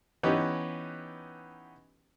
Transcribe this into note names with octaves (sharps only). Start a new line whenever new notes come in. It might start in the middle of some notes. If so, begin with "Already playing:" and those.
E3 B3 C#4 D#4 G4 B4